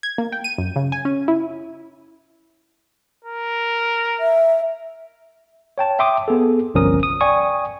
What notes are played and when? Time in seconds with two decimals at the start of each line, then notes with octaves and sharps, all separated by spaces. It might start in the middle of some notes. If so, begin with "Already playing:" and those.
0.03 G#6
0.18 A#3
0.32 G5
0.44 D#7
0.58 F#2
0.76 C#3
0.92 G#5
1.05 C#4
1.28 E4
3.25 A#4
4.20 E5
5.78 C#5 G5 A5
5.99 E5 G5 C6 D6 D#6
6.28 B3 G#4 A4
6.74 G1 C2 F3 C#4 A#4 D#6
7.03 D#6
7.21 D5 G5 G#5 C#6 D#6